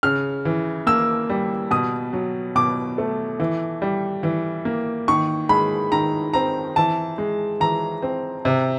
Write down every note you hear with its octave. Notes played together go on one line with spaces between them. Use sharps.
C#3 F6
E3
A#3 E6
G3
B2 D#6
F#3
B2 D6
A3
E3
G3
E3
A#3
D#3 C#6
G#3 B5
D#3 A#5
C4 A#5
E3 A5
G#3
E3 A#5
C4
C3